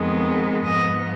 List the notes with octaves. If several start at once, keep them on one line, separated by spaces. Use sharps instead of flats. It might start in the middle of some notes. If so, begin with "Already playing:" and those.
Already playing: F2 D#3 G#3 B3
G#2 F3 B3 D#5